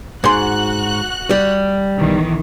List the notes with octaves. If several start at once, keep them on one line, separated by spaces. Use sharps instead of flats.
G#2 F#4 C6 F#6
G3
B1 D#3 E3